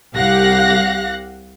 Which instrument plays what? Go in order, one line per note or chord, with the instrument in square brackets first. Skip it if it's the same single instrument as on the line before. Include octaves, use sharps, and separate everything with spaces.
[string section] C2 G4 F5 F#5 F#6 A#6